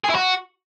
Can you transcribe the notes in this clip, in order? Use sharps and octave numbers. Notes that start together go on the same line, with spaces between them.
G#4
E4
F#4